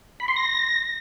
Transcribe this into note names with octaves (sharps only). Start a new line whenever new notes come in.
B5
C6
A#6